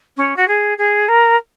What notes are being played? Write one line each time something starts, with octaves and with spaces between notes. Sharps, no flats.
C#4
F#4
G#4
G#4
A#4